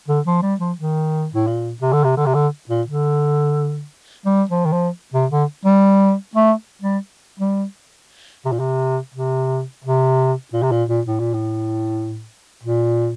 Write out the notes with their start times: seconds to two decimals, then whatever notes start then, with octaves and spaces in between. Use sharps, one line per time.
0.08 D3
0.26 F3
0.42 G3
0.60 F3
0.78 D#3
1.34 A2
1.47 A#2
1.82 C3
1.93 D3
2.04 C3
2.17 D3
2.26 C3
2.35 D3
2.69 A#2
2.87 D3
4.26 G3
4.49 F3
4.65 D#3
4.72 F3
5.14 C3
5.31 D3
5.65 G3
6.36 A3
6.82 G3
7.40 G3
8.45 C3
8.52 A#2
8.59 C3
9.14 C3
9.84 C3
10.53 A#2
10.63 C3
10.72 A#2
10.89 A#2
11.06 A2
11.20 A#2
11.34 A2
12.63 A#2